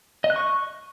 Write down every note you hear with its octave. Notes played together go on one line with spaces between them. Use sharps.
D#5
F#6
C#6